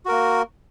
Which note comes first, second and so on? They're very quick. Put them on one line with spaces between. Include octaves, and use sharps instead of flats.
F#4 A#4 A#3